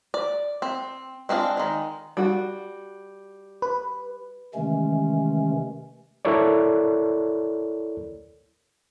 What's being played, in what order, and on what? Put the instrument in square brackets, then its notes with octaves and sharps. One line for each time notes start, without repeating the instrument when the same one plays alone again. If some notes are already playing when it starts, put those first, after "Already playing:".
[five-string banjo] D5
C4
G#3 C4 D4 F4
D#3 G#3
G3 F#4
[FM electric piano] B4
[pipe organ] C3 D#3 E3 G#3 A3 C#4
[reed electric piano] E4 A4 A#4 C#5 D5